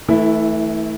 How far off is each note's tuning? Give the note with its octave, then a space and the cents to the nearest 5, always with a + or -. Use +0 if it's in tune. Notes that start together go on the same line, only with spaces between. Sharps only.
E3 -30 A3 +0 E4 +0